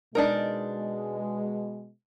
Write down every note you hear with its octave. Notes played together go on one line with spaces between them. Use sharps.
B2 G#3 D4 D#4 A#4